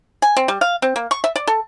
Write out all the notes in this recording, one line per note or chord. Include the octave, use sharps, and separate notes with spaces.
G#5
C4
G3
F5
C4
A#3
C#6
E5
D5
A4